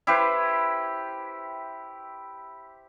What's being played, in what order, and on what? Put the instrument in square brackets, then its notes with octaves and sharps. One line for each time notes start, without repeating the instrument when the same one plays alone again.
[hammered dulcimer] E4 G4 B4 C5